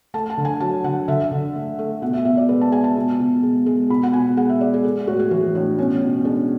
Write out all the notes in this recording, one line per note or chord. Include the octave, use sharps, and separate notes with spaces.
A3 A5
A5
D3
G#5
F#3 A5
D3 F#5
D3 E5
D3
A3
A3
B2 F#5
E5
B2 E5
D5
G#3 B4
A5
G#3 G#5
A5
B2
B2
G#3
G#3
B2 B5
F#5
B2 G#5
G#3 F#5
E5
G#3 D5
G#4
G#3 A4
A2 F#4
G#4
E3 F#4
A2 D4
B2 C#4
B2
G#3 D4